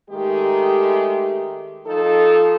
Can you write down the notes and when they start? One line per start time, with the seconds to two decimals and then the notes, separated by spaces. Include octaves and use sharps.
0.10 D#3 G#3 A3 G4
1.87 F3 D#4 A4